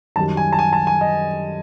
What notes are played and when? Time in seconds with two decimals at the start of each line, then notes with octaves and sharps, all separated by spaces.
0.16 F#2 D#3 G3 A5
0.37 G#5
0.52 A5
0.59 G#5
0.73 A5
0.87 G#5
1.01 D#5